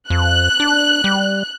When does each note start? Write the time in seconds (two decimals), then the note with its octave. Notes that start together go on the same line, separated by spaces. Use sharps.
0.10 F2 F#6
0.60 D4
1.04 G3